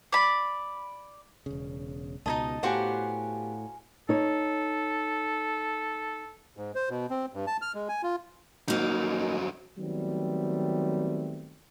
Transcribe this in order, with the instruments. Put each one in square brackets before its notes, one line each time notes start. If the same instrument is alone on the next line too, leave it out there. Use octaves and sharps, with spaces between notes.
[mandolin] D5 B5
[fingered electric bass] E1 C#3
[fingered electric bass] C#2 B2 [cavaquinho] D#4 E4 D#5 [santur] A5 A#5
[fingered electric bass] A2 [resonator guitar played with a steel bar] B3 G4 [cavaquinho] F#4 C5 F#5 [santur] F5 G#5
[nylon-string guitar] D#4 C#5 [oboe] A4
[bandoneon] G#2
C5
B2
C4
G2
A5
F6
G#3
G#5
F4
[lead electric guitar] F2 F#3 [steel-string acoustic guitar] A#3 D#4
[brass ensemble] D#3 F#3 G3 A3 B3 C4